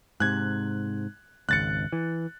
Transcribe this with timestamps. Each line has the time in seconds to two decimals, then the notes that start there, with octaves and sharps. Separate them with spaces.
0.20 G#2 C3 F#6 G#6
1.49 G#1 C#2 F#6 A6 C#7
1.92 E3